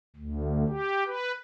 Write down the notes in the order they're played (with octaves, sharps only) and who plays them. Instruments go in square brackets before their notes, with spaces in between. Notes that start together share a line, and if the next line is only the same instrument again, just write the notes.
[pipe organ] D2
G4
B4